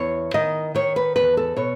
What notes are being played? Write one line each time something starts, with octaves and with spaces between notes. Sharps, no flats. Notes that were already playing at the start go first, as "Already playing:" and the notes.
Already playing: E2 C#5
D#3 D#5
D#3 C#5
B4
E2 B4
A4
B2 C#5